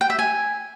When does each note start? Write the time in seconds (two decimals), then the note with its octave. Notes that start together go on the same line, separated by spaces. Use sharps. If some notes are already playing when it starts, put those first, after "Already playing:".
0.01 G5
0.10 E5
0.19 G#5